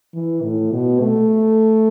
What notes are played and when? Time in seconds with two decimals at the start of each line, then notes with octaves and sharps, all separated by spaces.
0.14 E3
0.43 A2
0.72 B2
1.01 A3